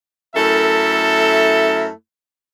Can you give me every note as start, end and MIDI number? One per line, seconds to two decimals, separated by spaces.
0.36 1.88 42
0.36 1.88 57
0.36 1.88 64
0.36 1.88 69
0.36 1.88 70
0.36 1.88 76